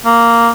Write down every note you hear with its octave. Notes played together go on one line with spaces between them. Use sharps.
A#3